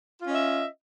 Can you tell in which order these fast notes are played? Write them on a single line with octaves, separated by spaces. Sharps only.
F4 C#4 D#5 E5